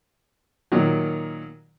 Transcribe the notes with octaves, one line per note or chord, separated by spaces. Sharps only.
A#2 D#3 F#3